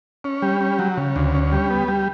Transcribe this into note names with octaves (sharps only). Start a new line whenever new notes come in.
C#4
G3
C#4
F#3
C#3
D2
C#4
G3
B3
G3